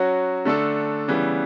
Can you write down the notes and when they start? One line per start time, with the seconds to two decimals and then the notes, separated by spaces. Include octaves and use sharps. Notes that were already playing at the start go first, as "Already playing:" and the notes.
Already playing: F#3 C#4 F#4
0.45 D3 A3 D4 A4
1.08 C#3 E3 G3 B3